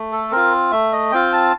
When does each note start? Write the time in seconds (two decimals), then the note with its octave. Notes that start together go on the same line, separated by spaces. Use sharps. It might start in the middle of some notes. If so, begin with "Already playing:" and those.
Already playing: A3
0.12 A4
0.31 C4 F4 A#4
0.71 A3 E5
0.92 D#5
1.12 C4 F4 G5
1.33 A5